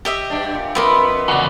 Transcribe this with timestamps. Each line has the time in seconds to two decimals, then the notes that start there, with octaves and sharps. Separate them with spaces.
0.05 G4 D#5 E5
0.30 G2 D4
0.55 A#2
0.75 F2 B3 A#4 D#5 E5 B5 C6 D6
1.28 E2 C#3 F#4 D5